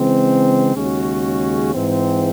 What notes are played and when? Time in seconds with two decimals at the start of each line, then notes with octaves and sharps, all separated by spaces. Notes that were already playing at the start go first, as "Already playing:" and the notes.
Already playing: C#3 E3 G#3 C4
0.73 D#2 C#3 G#3 C#4 F#4
1.73 G#2 E3 C4